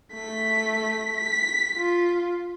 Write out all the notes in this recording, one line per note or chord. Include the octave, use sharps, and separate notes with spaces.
A3 B6
B6
F4